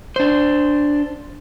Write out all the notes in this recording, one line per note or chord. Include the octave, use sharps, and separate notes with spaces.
D4 C5